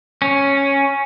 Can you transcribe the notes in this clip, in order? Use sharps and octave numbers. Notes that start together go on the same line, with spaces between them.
C#4